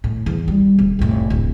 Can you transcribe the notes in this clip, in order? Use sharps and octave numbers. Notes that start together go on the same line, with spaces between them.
A2
E2
G3
D#1
F1 A2
D1